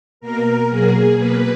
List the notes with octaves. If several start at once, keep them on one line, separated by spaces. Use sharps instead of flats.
B2 A#3 A#4
B2 F#3 A#3 G#4
B2 A#3 B4